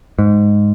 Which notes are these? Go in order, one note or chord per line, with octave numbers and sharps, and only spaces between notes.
G#2